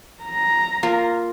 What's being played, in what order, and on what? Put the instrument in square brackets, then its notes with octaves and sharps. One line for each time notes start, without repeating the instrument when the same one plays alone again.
[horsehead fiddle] A#5
[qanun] A#3 F4